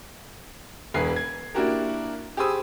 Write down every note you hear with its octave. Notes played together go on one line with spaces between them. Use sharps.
E1 G#4 B4 C7
G#6
A#3 D4 E4 F#4 G4 A#4
G4 G#4 C5 B5 D#6 E6